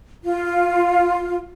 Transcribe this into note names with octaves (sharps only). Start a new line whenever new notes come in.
F4